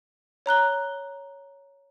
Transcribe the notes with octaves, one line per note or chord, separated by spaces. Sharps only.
C#5 A#5 F#6 G7